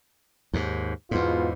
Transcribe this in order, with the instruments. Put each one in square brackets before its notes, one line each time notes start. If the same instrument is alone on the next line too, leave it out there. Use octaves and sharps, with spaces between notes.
[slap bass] D#2 G#2
[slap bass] E2 G#2 [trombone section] B2 B3 F4